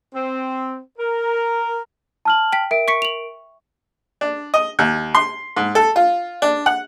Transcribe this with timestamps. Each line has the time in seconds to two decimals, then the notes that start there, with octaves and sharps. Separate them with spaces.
0.14 C4
0.99 A#4
2.25 A5 F6 F#7
2.53 G5 B6
2.71 A#4 E5 D7
2.88 C#6 B6 C#7
3.02 F7 F#7
4.21 D4
4.54 D#5
4.79 D#2
5.15 C6
5.56 G#2
5.75 A4
5.96 F4
6.42 D4
6.66 F#5